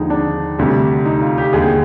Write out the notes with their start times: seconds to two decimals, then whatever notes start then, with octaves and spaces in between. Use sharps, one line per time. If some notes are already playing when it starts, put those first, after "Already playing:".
Already playing: D#2 D3 F3 G#3 D#4
0.10 D4
0.59 D2 C3 G3
1.05 D#4
1.22 F4
1.38 G4
1.53 D#2 D3 G#3 G#4